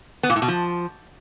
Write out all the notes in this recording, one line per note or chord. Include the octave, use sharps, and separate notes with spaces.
B3
A#2
A2
B2
F3